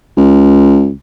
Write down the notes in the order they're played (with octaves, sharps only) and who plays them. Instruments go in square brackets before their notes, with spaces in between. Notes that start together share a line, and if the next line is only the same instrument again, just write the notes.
[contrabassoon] C#2